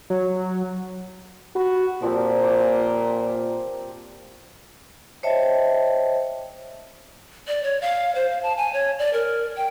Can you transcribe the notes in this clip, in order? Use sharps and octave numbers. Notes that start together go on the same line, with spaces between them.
F#3
F#4 B5
A#2 F3 G3 C4
A#5 D6
C5 C#5 D#5 E5 G5 A5
D5
C#5
F5
C5
F5
A5
G#5
C#5
D5
A#4
G5